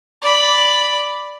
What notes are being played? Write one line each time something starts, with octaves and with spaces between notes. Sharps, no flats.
D5 B5